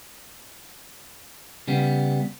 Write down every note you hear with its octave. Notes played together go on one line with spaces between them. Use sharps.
C#3 G3 B3